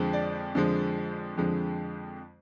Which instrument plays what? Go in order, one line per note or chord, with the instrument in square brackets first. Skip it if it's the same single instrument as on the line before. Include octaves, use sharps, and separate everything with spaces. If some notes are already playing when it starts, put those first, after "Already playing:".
Already playing: [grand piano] F2 D3 F3 G#3
D5
F2 D3 F3 G#3
F2 D3 F3 G#3